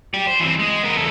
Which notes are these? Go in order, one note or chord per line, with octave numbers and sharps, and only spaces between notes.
G4 D5
C5
E3 C4
G#3
B3 A#4
E2 A4